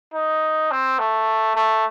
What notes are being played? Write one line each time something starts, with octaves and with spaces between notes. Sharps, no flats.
D#4
C4
A3
A3